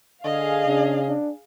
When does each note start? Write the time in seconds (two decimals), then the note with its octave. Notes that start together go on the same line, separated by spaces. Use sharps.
0.24 D3 G#4 D#5 F5
0.67 C#3 D4
1.08 D4